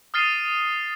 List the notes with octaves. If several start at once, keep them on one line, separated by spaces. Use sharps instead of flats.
D#6 F6 A6 C7 D#7